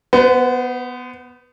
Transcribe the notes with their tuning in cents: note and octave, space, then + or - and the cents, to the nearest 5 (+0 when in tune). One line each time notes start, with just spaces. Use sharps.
B3 +0 C5 -40